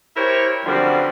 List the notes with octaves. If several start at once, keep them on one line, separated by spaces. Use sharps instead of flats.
E4 G4 A#4 C5 C#5
F#2 D3 F3 G3 C4 B4